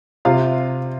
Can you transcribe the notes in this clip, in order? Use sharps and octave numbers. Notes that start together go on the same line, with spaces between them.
C3 F4 F5